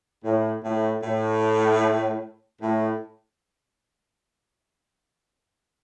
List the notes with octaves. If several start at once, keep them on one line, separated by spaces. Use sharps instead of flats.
A2
A2
A2
A2